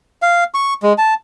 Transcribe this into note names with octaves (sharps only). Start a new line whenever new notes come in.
F5
C#6
G#3
A5